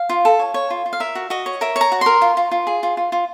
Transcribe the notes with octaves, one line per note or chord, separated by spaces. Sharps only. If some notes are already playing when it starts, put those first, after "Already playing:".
Already playing: F5
F4
A4
C#5
C#5
F4
F4
F5
A#4 E5
F#4
F#4 D#5
C#5
A#4 E5
C#5
A#5
F#4
A#4 C6
F4
F4
F4
G#4
F4
F4
F4